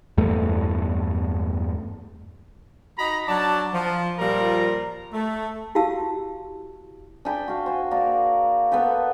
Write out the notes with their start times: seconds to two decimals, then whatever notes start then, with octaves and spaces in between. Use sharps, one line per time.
0.18 E2 G2 A3
2.98 D#4 F#4 D#5 A#5 B5
3.28 F#3 D4 D5 A5
3.74 F3
4.19 A#2 F3 G3 F4 A#4 A#5
5.13 A3
5.75 E4 F#4 G4 F5 A5 E6
7.25 D4 G#4 G5 B5
7.48 F#4 F5
7.66 C5 G#5
7.91 A#3 A#4 D5
8.72 B3 A4 B4 G5